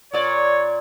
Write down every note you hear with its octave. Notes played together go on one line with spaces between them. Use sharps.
A#2 C#5 D5